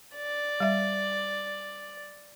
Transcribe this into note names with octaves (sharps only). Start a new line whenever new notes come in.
D5
G3 E5